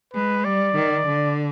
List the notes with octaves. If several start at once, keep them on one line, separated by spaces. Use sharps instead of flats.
G#3 B4
G3 D5
D#3
D3